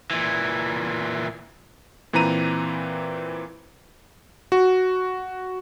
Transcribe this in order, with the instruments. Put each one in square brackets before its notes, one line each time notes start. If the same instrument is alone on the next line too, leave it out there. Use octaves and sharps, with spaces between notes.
[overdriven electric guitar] A#2 E3
[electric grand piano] A#2 E3 C4 B4 A#5 D#7
F#4